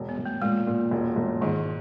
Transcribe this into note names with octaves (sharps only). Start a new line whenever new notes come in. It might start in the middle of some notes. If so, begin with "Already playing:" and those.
Already playing: E1
B3
E1
A3
A#2 G#3
A#2
E1
E1
G#2 D#3